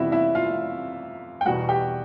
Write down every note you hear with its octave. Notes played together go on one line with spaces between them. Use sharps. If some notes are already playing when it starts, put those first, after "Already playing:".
Already playing: F2 C3 E3 G3 E4 F#4 E5
E4 E5
F4 F5
G5
E2 B2 G3 F#4 F#5
G4 G5